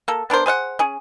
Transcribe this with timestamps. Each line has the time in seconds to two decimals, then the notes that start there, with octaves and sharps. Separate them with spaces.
0.08 A#3 A4
0.30 B3 D4 A#4 C5
0.46 G#4 C5 F5 F#5
0.79 C#4 G#4